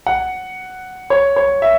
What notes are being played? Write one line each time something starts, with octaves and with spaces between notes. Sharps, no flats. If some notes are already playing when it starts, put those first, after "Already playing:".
F#5
C#5
C#5
E5